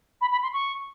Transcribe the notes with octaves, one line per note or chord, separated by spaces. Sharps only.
B5
B5
C6
C#6